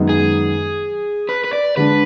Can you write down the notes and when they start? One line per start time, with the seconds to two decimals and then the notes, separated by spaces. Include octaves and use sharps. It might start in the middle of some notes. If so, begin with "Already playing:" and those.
Already playing: F#2 D#3 G#3 B3 D#4
0.09 G#4
1.29 B4
1.44 B4
1.53 D5
1.77 D3 G#3 D4 B4